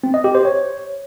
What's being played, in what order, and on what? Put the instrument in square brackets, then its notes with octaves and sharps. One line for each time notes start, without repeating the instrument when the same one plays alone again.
[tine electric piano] C4
D#5
G4
C5
C#5